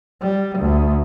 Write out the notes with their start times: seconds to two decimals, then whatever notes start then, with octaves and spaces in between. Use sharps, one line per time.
0.21 G3
0.58 D2